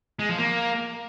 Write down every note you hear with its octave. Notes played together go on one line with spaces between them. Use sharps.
G#3
F3
A#3